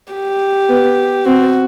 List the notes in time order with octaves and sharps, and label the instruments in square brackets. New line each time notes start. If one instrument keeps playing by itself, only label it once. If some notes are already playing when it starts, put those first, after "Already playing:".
[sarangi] G4
[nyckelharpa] B3
[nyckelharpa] C4 [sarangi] F#4